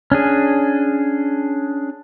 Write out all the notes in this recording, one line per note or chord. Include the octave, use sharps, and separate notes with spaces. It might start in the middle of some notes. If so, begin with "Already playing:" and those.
C#4 D4 G#4